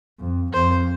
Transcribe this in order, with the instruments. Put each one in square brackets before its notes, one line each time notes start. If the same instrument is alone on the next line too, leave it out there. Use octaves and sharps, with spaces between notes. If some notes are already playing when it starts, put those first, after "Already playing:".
[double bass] F2
[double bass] F2 [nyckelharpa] C5